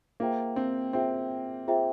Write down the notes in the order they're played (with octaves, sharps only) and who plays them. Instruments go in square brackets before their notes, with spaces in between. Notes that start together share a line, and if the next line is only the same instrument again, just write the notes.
[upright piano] A#3 [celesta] F4 G#4 C5 E5 G5
[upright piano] C4
[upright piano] C4 [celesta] F4 G#4 C5 E5 G5
[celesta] F4 G#4 C5 E5 G5